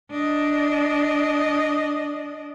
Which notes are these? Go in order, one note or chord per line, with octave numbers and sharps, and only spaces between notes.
D4 D#5